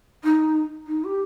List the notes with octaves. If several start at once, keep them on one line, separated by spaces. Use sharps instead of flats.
D#4
D#4
G4